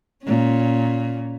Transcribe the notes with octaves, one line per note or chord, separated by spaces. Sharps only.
A#2 C#4